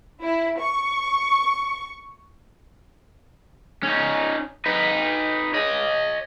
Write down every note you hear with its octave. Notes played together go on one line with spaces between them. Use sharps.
E4
C#6
C#4 D#4
D#4 B4
C#5 D#5